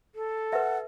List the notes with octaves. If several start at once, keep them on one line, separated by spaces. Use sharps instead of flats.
A4
B4 E5 F#5